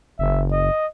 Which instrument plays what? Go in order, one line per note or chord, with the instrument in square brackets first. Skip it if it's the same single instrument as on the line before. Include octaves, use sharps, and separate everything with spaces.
[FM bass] F#1 [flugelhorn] E5
[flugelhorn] D#5